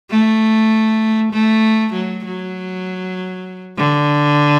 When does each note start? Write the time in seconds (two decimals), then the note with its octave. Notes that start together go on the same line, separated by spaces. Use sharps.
0.10 A3
1.33 A3
1.93 F#3
2.25 F#3
3.77 D3